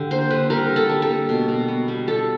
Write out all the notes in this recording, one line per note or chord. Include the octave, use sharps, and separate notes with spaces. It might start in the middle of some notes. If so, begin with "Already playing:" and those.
Already playing: D3 G4
A#3 C5
D3 B4
G3 A#4
D3
A4
G3
A4
A#3
B2
B2
B3
G3
G3 A4